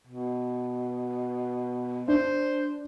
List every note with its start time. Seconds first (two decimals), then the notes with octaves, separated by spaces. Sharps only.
0.07 B2
2.08 D4 C5